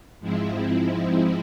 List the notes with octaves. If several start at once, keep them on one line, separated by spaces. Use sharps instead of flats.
G#2 F3 G#3 C4 E4